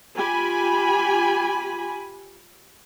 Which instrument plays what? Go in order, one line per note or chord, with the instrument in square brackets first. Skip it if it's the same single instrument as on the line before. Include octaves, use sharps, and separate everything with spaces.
[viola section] F4 G4 G#5 B5